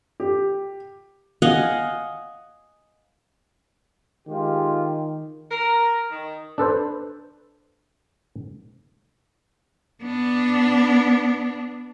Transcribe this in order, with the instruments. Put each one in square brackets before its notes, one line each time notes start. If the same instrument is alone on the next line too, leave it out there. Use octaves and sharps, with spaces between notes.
[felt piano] G4
[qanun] D#5 F5 F#5 G#5
[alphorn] D#3 [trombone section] G#3 F4 G4
[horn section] A#4
D#3
[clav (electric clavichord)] D4 A4 B4 C5
[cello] B3 D4